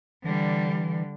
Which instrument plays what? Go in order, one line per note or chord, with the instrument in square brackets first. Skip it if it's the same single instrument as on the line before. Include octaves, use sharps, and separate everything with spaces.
[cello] D3 G3 [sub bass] E3